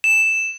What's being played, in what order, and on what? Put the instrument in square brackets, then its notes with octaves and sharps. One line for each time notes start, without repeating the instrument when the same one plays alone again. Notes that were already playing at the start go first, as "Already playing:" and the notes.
[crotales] E7